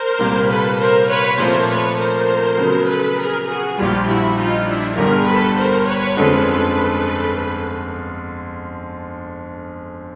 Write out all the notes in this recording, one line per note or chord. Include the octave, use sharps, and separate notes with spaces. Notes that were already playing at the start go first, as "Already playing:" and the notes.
Already playing: A#4 C5
C2 A#2 G3 A#3
A4 B4
A#4 C5
B4 C#5
A#2 F3 A3 C4 F4 A#4 C5
B4 C#5
A#4 C5
C#3 F#3 B3
A4 B4
G#4 A#4
F#4 G#4
A#1 A#2 G3 F4 G4
E4 F#4
D#4 F4
D4 E4
G1 G2 D3 G3 G#4 A#4
A4 B4
A#4 C5
B4 C#5
F2 D3 F3 G#3 C#4 A4 B4
A4 B4